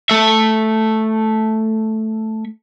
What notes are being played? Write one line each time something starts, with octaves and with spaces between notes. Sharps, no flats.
A3 E5